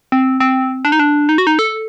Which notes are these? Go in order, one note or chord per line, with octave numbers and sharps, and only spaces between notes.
C4
C4
D4
D#4
D4
D#4
F#4
D#4
A4